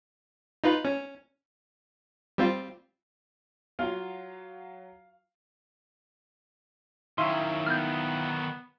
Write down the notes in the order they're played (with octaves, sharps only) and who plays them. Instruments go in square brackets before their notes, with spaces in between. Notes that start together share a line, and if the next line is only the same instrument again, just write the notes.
[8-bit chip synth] D#4 F4 B4
C#4
G3 C4 F4
[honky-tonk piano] F#3 [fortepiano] F4 [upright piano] F5
[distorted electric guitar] D#3 F#3 [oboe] C#4 [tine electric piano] E4 E5 F5 [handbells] C6
[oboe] B3 [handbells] F6 G6